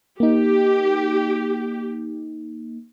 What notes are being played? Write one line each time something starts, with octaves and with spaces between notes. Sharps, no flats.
A#3 D#4 G4